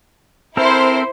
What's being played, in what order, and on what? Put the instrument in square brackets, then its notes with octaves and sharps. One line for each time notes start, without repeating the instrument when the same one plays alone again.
[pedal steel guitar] C4 A4 A#4 [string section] E4 C5